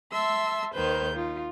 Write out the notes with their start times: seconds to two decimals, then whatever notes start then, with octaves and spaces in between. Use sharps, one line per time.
0.12 E5 A5 C6 E6
0.74 D#2 D#3 B4 C5 G6
1.14 D#4 F4